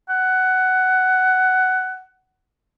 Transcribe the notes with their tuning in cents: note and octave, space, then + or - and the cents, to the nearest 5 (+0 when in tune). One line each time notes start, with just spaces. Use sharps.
F#5 +10